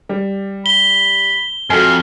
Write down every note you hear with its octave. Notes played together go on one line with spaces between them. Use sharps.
G3
B5 G7
F2 F#4 A4 F5 G#5